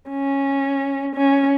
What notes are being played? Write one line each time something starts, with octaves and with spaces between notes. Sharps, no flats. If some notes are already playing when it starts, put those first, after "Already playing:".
C#4
C#4